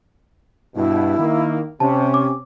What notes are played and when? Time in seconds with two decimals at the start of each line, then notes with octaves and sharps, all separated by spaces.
0.76 G2 B2 E4
1.18 D#3 A#3
1.80 C3 C#4 A5
2.14 D6